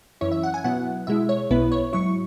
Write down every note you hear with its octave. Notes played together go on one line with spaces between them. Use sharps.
F#2 E3 C#4 E4 C#5
E5
F#5
G#5
B2 F#3 B3 E4 F#5
B2 G#3 E4 E5
C#5
B1 B2 B3 E4 B4
C#5
G#2 F#3 E4 C#6